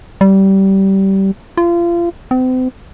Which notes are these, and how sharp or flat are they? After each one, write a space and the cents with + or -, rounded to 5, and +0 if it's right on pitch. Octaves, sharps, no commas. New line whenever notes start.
G3 -20
F4 -30
C4 -40